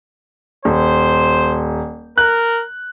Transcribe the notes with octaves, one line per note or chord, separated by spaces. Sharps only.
D#1 C5
A#4 F#6